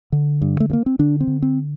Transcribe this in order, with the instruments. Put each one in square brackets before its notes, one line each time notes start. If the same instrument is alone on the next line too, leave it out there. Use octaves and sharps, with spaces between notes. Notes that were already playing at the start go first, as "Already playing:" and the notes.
[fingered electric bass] D3
G2
A3
G2
A#3
C4
D3 D4
C4
D3
C4